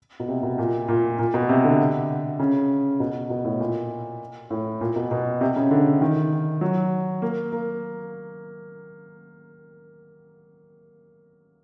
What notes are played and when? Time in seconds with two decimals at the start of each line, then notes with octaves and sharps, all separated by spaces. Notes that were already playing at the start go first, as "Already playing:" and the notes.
0.20 B2
0.28 C3
0.43 B2
0.58 A#2
0.88 A#2
1.19 A#2
1.34 B2
1.49 C3
1.64 D3
2.39 C#3
3.00 B2
3.30 B2
3.45 A2
3.60 A#2
4.50 A2
4.81 A#2
4.96 B2
5.11 B2
5.41 C3
5.56 C#3
5.71 D3
6.01 D#3
6.61 F#3
7.22 A#3
7.52 A#3